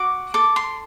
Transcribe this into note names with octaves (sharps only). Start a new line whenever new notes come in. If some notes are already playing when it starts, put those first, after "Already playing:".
Already playing: F#4 D6
A4 D6
C6